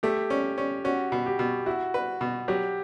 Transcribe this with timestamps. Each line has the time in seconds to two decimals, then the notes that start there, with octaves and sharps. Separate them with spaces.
0.03 A3 G4
0.30 C#4
0.58 C#4
0.84 C#4 F#4
1.12 B2
1.26 G4
1.39 B2
1.66 E4 F#4
1.94 B4
2.21 B2
2.48 F#3 G4